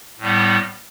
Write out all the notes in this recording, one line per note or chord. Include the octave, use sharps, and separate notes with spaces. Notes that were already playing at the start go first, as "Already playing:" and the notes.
A2 G3 B3